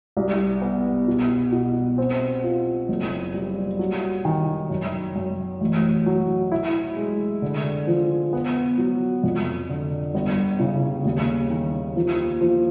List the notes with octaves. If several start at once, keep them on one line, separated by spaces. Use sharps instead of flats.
C2
B3
B2
B2
C4
F4
F#1
G3
F#3
D#3
F#2
F#2
A1
F#3
E4
G#3
D3
F3
B3
F#3
F2
D3
G1
C#3
D#2
D#3
F3
F3